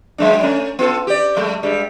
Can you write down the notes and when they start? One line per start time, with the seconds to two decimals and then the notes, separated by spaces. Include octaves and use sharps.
0.18 F#3 G#3 D4
0.43 A3 C#4
0.79 B3 F4 A4
1.07 G4 D5
1.36 F#3 G#3 A3
1.63 G2 G3 G#3